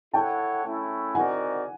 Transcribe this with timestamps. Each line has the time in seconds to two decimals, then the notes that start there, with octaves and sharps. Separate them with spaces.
0.13 E4 A4 C#5 F#5 G5 A5
0.64 A3 C#4 E4
1.15 C4 D#4 F#4 A#4 D5 F#5 G#5